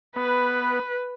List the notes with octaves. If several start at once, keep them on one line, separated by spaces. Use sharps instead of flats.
B3 B4